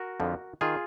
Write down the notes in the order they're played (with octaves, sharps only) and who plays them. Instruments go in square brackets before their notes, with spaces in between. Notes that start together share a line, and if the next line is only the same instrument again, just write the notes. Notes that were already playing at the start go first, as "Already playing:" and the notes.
Already playing: [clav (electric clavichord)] F#4 A#4
F2 D3 F3
D#3 F4 G#4